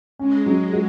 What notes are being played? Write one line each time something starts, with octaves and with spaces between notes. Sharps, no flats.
G#3 C#4
F#3
F#4